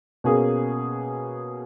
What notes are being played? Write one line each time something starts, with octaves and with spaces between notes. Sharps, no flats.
B2 A#3 C#4 G#4